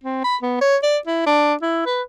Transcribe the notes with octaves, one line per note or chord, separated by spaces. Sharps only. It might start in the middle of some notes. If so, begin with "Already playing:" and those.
C4
B5
B3
C#5
D5
E4
D4
E4
B4